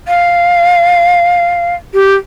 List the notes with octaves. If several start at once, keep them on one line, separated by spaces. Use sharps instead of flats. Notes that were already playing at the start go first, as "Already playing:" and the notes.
F5
G4